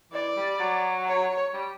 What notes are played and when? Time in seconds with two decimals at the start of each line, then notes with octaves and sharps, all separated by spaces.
0.12 E3 D5
0.37 G3
0.60 F#3
1.07 C#5
1.54 G3